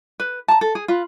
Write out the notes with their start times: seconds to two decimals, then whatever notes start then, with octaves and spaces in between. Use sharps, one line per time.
0.20 B4
0.48 A5 A#5
0.61 A4
0.75 G#4
0.88 F4 B4